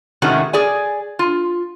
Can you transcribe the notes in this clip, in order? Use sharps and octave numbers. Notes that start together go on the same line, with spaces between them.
A2 C3 D#3 G#3 C#4 F#4
G#4 D5 G#5
F4